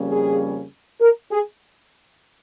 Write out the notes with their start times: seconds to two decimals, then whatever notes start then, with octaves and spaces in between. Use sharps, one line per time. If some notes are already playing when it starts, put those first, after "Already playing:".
Already playing: F2 C#3 G3 A#3 C#4
0.10 G#4
1.01 A#4
1.31 G#4